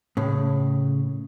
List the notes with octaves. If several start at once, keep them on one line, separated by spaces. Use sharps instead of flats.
A2 C#3